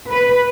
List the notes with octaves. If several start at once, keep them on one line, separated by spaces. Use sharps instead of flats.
B4